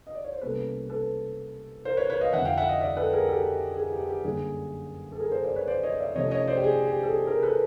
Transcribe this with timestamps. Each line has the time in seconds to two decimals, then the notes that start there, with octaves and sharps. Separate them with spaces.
0.07 D#5
0.15 D5
0.24 C#5
0.33 C5
0.41 C2 B2 G3 A#3 C#4 A4 B4
0.89 A4 B4
1.85 A#4 C5
1.97 B4 C#5
2.10 B4 C#5
2.21 D#5 F5
2.33 F2 D3 F3 E5 F#5
2.45 F5 G5
2.58 E5 F#5
2.69 D#5 F5
2.81 D5 E5
2.97 A4 B4
3.13 G#4 A#4
3.29 G4 A4
3.77 G#4
3.92 G4
4.09 G4
4.25 F#2 D3 G3 A#3 C#4 G#4
5.12 A4
5.20 G#4 A#4
5.32 A#4 C5
5.44 C5 D5
5.56 B4 C#5
5.67 C5 D5
5.83 C#5 D#5
5.99 D5 E5
6.15 C3 F3 A3 C#4 C#5 D#5
6.31 C#5 D#5
6.47 C5 D5
6.57 G4
6.64 G#4
6.87 G4
7.03 A4
7.12 G#4
7.27 G#4 A#4
7.43 A4 B4